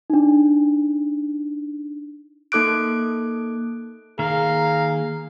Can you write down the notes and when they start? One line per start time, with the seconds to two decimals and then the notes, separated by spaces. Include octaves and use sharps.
0.10 D4 D#4
2.52 A#3 D#4 A4 D6 F#6 D7
4.19 D#3 A#3 G#4 F5 A#5